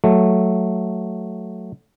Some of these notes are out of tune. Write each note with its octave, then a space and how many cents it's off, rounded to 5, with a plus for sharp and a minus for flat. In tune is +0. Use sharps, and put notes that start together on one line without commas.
F#3 +0 A3 +0